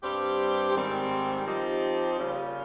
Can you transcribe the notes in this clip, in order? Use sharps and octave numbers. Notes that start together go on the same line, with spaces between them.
G2 G3 C4 G4
G#2 D#3 G3 C4
F3 C4 D#4 G4
C#3 G3 A#3 C#4 F4